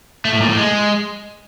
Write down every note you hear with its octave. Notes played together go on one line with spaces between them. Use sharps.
A3
A2
A#2
A2
G#3